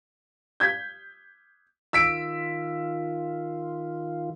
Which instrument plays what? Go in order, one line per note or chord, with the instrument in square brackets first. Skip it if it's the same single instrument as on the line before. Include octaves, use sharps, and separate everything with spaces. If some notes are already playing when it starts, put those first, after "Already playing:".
[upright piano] G6 G#6 B6
[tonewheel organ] D#3 F4 [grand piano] E6 B6 D7